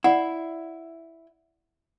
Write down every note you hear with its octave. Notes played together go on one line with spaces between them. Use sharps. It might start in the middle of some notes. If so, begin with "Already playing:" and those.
E4 D5 F#5